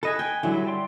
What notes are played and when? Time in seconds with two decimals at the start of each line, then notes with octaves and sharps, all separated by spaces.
0.03 A4 B4 D#5 G#5
0.19 G5 G#5
0.43 D3 F#3 G3 E4
0.67 D5 G5 C6